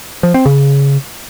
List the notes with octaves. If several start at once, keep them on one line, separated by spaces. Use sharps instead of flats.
F3
C4
C#3